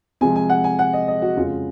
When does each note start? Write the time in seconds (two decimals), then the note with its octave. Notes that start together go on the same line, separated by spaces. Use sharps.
0.21 C3 F3 G#3 G#5
0.36 G#5
0.49 F#5
0.64 G#5
0.79 F#5
0.93 D#5
1.08 D#5
1.22 F#4
1.37 F2 C#3 G#3 F4